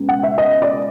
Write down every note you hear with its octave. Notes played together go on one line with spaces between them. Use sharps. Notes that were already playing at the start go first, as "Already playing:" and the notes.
Already playing: C#2 B2
F#5
E5
D#5
D5